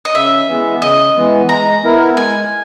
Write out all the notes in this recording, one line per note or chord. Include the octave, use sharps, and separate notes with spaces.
D#5
C#3 E5
E3 G#3 B3
C#3 D#5
E3 G#3 B3
G#3 A#5
B3 E4 A#4
G#3 G#5